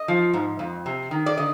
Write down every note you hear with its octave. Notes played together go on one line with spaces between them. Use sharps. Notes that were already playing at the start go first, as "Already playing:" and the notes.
Already playing: D#5
F3
G#2
F2
C3
D#3
D5
D3 D#5